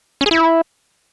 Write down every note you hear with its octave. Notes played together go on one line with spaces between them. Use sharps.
C#4
G#4
E4